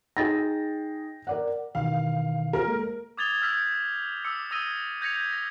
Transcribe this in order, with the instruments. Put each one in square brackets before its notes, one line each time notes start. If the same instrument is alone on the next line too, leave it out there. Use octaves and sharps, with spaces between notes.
[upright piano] D#4 G#4 [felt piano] G5 A6 A#6
[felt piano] A#4 D5 F#5
[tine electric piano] B2 D#3 E3 [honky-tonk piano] F5
[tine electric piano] F4 G#4 C5 [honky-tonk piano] A#4
[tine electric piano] G#3 A#3 A4
[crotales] D6 D#6 G#6 A6 F7 G7
E6 F6 G6 G#6 B6
D6 E6 C#7
D#6 E6 G#6 A#6 D#7 G7
G6 G#6 A#6 B6 C#7 F7
A#6